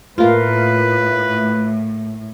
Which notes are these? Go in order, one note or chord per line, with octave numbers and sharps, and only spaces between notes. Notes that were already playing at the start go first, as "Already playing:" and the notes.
A2 A3 A#3 F4 A#4 B4 F5